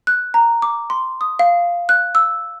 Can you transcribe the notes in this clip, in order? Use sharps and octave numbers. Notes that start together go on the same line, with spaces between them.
F#6
A#5
D6
C6
D#6
F5
F#6
E6